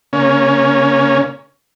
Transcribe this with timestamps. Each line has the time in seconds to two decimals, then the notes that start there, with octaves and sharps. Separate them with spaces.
0.13 C#3 A#3 C#4